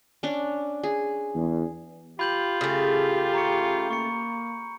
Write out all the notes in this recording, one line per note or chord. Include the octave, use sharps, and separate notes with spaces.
C#4 D4
G#4
E2
F4 G4 B5 G6 F#7
C#3 A3 G4
A#5 C#6 C#7
A#3 C#6 C#7